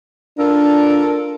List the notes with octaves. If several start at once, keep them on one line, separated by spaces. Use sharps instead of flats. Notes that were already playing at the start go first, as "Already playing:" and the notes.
D4 F4 A4 A#4